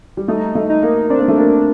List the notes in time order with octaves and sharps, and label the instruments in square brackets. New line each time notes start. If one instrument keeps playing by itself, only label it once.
[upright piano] G3
[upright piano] A3 [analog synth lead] D#4
[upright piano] A3
[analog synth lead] D#4
[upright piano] A#3
[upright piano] C4 [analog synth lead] D4
[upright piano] A#3
A3
A#3